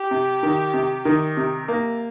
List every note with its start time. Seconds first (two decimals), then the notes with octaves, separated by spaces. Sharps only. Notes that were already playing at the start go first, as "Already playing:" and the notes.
Already playing: G4
0.11 C3
0.43 D#3
0.74 C3
1.05 D#3
1.37 C3
1.68 A#3